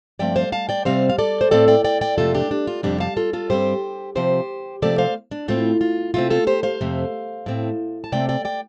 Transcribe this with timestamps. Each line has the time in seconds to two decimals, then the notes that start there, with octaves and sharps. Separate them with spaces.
0.19 G2 F3 A3 C4 D5 G5
0.36 C5 F5
0.52 F5 A5
0.69 D5 G5
0.85 C3 G3 C4 C5 F5
1.09 F5
1.18 A4 D5
1.41 C5
1.51 A2 A3 C4 A4 D5
1.68 D5 G5
1.84 D5 G5
2.01 D5 G5
2.18 F2 C3 A3 F4 A4
2.34 D4 G4
2.51 D4
2.67 F4
2.83 F2 C3 G3 C4 D4 G4
3.00 F5 A5
3.17 F4 A4
3.33 F4 A4
3.50 G2 G3 C4 G4 C5
4.15 C3 F3 C4 G4 C5
4.82 C3 F3 A3 C4 A4 D5
4.98 C5 F5
5.31 D4
5.48 A2 A3 C4 F4
5.81 F4
6.14 C3 A3 C4 F4
6.30 F4 A4
6.47 G4 C5
6.63 C5 F5
6.81 F2 C3 A3
7.46 A2 A3 C4
8.04 A5
8.12 C3 A3 C4 D5 G5
8.29 D5 G5
8.45 D5 G5